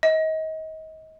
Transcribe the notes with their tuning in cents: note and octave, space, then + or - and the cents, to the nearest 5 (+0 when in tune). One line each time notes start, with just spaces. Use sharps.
D#5 +30